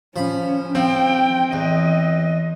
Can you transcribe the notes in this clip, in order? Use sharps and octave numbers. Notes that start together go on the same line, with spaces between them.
F3 C#4 B5
F3 C4 G5
E2 D#5